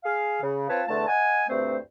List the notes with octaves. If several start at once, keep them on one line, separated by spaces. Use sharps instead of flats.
G#4 F5
C#3
C4 F4 B4 C#5 A5
E2 D3 A3 A5
D#5 F#5 G#5
D2 G2 A3 C4 C5